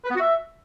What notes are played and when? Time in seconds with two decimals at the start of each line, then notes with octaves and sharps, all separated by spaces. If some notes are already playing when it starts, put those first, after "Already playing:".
0.05 B4
0.10 B3
0.15 F#4
0.20 E5